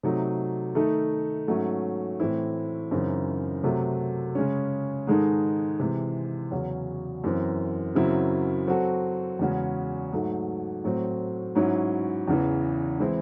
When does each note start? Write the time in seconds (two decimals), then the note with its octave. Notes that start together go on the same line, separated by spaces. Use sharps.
0.03 C3 F#3 A3 D#4
0.75 D#3 A3 D#4 A4
1.47 G#2 F#3 A3 C#4
2.20 A2 E3 C4 E4
2.91 F#2 C#3 E3 C4 D#4
3.64 C3 F#3 A3
4.35 C#3 G#3 C#4
5.07 G#2 D#3 G#3 D#4 A4
5.80 C3 E3 G#3
6.51 E2 C#3 F#3 C#4 F#4
7.24 F#2 E3 C4
7.95 F#2 C#3 F#3 C4 E4
8.67 F#3 C4 F#4 A4
9.39 E2 C#3 G#3 C#4 F#4
10.12 G#2 F#3 A3
10.84 A2 F#3 C4
11.55 G#2 F#3 C#4 E4
12.28 E2 C#3 E3
13.00 E3 G#3 C4 E4